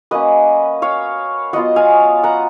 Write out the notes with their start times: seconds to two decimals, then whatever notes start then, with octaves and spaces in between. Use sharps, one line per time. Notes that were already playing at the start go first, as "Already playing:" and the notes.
0.11 F#3 A#3 C#4 B4 D#5
0.82 C#5 F5
1.53 F#3 B3 F4 D#5 F#5
1.76 F5 G#5
2.23 F#5 A#5